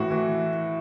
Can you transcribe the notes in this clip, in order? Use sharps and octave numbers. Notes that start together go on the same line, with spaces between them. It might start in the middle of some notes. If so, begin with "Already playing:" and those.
Already playing: A2 E3 F#4
E3